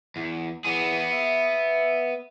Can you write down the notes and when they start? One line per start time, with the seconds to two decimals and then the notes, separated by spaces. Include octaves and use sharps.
0.16 E2
0.64 E2 E3 B3 G#4
1.12 E5